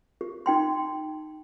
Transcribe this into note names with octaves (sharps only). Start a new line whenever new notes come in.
G4
D#4 G5 C6